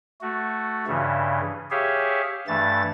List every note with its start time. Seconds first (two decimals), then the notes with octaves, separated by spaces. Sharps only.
0.21 A3 F#4
0.87 G2 C#3 E3
1.71 G4 G#4 C#5 E5 F5
2.47 G2 E3 A3 A6